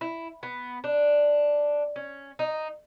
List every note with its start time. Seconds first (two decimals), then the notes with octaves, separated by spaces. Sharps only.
0.01 E4
0.43 B3
0.84 D4
1.96 C#4
2.39 D#4